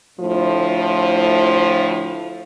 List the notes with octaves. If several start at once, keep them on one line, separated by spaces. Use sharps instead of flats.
D2 A2 F3